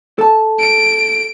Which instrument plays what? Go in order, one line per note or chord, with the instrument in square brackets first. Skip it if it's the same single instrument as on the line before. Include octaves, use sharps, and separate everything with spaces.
[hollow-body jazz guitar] A4 A5
[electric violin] D7